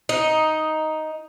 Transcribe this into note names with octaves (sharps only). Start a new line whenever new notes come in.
D#4